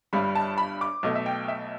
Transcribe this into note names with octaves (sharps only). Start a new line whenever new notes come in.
G1 G2 G3 B5
A5
B5
D6
B1 B2 A3
E5
G5
E5